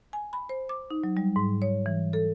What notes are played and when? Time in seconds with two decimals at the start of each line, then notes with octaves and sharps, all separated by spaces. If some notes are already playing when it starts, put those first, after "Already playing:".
0.13 G#5
0.33 B5
0.49 C5
0.69 D6
0.91 D#4
1.04 F#3
1.17 G3
1.36 G#2
1.62 C#5
1.86 E3
2.13 A4